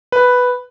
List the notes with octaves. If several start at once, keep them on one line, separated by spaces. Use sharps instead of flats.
B4